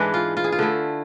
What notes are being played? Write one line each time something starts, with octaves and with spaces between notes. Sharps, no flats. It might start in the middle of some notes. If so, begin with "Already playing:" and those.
Already playing: G#2 E3 G#3 D4 B4
F4
F4
G#4
F4
D3 A3 E4